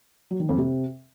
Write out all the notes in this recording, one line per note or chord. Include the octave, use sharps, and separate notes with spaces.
F#3
D#3
F2
C3